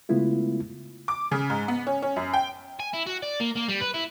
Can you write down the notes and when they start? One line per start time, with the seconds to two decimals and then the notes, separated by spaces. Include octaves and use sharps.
0.09 C#3 G#3 A3 B3 E4 F4
1.08 D6
1.32 C#3
1.50 G#2
1.68 B3
1.87 C#4
2.02 C#4
2.16 F#2
2.33 G5
2.80 G#5
2.94 E4
3.07 F#4
3.22 D5
3.40 A#3
3.56 A#3
3.68 G3
3.81 B4
3.94 E4